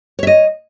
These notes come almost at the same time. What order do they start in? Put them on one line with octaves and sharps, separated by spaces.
C#5 E5 D#5